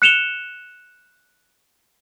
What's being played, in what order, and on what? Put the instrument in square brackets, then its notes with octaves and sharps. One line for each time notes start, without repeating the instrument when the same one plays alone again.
[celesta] F#6 C#7 E7 F7 G7